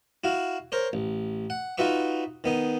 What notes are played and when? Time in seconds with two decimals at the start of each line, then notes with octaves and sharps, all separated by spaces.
0.24 E4 F#4 F5
0.72 A#4 C5 C#5
0.93 A1
1.50 F#5
1.78 D#4 F4 F#4 B4 E5 C#6
2.44 D#3 B3 D#4